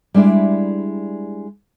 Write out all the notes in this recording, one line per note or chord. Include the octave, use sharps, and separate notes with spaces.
G3 G#3 D4 E4